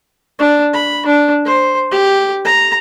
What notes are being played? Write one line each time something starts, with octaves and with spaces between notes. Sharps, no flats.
D4
B5
D4
C5
G4
A#5